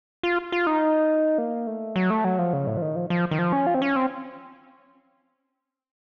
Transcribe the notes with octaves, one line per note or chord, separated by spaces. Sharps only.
F4
F4
D#4
A#3
A3
F#3
A3
F#3
F3
C#3
A2
F3
D#3
F3
F3
D#3
F3
C#4
F4
C4
C#4
C4